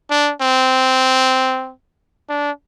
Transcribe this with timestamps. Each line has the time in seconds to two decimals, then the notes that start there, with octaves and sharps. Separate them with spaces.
0.10 D4
0.41 C4
2.29 D4